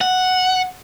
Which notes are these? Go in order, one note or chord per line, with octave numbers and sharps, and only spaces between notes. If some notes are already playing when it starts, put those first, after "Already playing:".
F#5